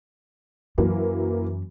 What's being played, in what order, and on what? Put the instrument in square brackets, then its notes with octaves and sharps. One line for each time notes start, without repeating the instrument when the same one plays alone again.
[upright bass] F#2 [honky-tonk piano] E3 F#3 A#3